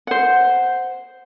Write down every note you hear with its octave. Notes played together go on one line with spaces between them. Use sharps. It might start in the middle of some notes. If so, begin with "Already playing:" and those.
C5 F#5